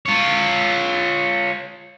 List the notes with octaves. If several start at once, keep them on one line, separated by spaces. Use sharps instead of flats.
F4 C#5